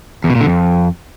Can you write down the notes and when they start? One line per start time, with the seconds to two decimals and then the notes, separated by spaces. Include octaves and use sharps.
0.24 E2
0.30 B2
0.35 A#2
0.41 D3
0.46 F2